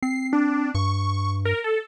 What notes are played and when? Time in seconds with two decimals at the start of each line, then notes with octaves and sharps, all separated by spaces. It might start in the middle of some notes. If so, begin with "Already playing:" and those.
0.03 C4 C7
0.33 D4
0.75 G2 C#6
1.45 A#4
1.64 A4